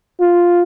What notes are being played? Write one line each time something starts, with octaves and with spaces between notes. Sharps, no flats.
F4